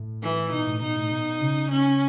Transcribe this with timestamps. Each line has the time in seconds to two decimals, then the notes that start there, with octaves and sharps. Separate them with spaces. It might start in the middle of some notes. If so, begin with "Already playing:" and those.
Already playing: A2
0.22 E3
0.52 B2 D#4
0.67 A2
0.81 B2 D#4
0.96 A2
1.11 B2
1.41 C#3
1.71 C#4